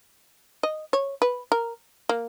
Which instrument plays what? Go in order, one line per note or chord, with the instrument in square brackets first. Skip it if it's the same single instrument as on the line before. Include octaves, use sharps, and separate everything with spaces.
[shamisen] D#5
C#5
B4
A#4
A#3